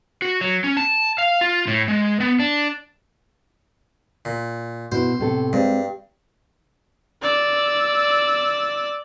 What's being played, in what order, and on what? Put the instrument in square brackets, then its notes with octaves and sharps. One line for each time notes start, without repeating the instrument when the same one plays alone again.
[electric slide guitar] F#4
F#3
C#4
A5
F5
F4
A2
G#3
B3
D4
[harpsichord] A#2
[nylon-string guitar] B2 E4 [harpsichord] C5
[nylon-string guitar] A2 C3 A4
[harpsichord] G2 [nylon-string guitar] G#3 C4
[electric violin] D5 E6